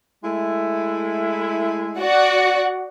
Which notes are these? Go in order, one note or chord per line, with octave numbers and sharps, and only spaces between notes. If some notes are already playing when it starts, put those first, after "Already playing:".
G#3 A3 E4
F#4 D5 F#5